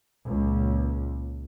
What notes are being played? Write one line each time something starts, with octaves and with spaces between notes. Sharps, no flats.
C#2 A#2